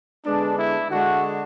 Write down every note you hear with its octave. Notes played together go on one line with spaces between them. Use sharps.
D3 G#3 B3 D4
E4
D3 G#3 D4 F#4